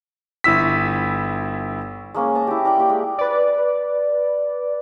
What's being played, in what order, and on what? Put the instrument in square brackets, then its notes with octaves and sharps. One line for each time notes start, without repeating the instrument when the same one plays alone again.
[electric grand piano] G1 E4 E6 B6
[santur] G#3 A#3 C#4 G#5
D#5 A5 A#5
E4 G4
A#4 D5 G5
A#3 G4
G#3
[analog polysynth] B4 D5